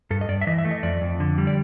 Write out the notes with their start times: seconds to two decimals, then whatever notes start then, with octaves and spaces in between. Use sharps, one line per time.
0.11 G2 A4
0.21 D#5
0.29 G2 D5
0.41 E5
0.47 E3 D#5
0.58 E5
0.65 A3
0.71 D#5
0.83 F2 D5
1.01 F2
1.20 D3
1.38 G3
1.47 D5